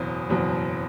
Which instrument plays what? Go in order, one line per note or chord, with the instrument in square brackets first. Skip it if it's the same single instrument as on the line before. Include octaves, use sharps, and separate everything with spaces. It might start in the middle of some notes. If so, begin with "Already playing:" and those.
Already playing: [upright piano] F#1 E2 B2 F#3 C4
F#1 E2 B2 F#3 C4